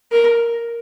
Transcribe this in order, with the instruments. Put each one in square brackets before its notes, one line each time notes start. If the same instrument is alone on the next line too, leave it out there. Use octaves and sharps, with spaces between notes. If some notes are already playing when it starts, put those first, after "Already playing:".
[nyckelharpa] A#4